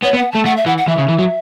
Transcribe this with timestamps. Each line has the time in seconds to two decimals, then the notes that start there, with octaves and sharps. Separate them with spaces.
0.03 B3 C#5
0.14 B3
0.18 F#5
0.32 A3 A5
0.45 A3 F#5
0.57 E5
0.66 E3 F#5
0.78 F#5
0.88 E3 E5
0.99 C#3
1.09 E3
1.19 F#3